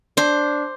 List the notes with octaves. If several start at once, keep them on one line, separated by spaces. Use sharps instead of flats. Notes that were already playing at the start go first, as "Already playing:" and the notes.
D4 C5